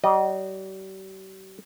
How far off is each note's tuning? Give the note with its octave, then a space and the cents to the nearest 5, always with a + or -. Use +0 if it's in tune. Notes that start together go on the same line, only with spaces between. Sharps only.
G3 -45 D#5 -25